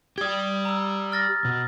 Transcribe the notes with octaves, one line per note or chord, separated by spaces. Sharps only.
G4 D5 D#6 G#6
A#5 E6
F6 A6 A#6
B2